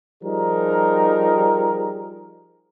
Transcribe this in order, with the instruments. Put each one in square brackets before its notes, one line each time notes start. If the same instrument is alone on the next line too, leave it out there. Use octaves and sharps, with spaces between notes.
[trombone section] F3 G3 D#4 G#4 A#4